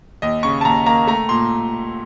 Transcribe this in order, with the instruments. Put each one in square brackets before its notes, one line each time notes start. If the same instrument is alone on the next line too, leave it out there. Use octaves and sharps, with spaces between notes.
[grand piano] D#2 D#5
C#3 C#6
A5
D#2 A#5
A#3 A#5
A3 A#5
A#2 C6